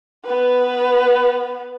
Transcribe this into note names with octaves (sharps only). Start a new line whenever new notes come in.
B3 B4